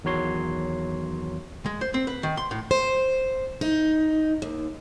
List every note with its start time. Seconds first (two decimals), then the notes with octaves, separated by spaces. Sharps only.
0.04 E2 D#3 F#3 C#5 C6
1.66 G#3
1.81 C5
1.94 C4
2.07 B4
2.23 D#3
2.37 C6
2.51 A2
2.71 C5
3.61 D#4
4.42 D#2